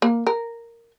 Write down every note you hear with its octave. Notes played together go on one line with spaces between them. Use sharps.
A#3
A#4